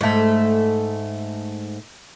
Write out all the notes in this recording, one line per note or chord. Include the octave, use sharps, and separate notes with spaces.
G#2 A3